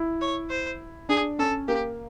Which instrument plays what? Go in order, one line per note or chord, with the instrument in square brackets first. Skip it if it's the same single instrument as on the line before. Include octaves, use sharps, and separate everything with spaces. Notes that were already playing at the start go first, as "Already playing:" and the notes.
Already playing: [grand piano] E4
[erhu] C#5
C5
[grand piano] D4 [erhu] G#4
[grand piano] C#4 [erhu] A4
[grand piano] A#3 [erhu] G4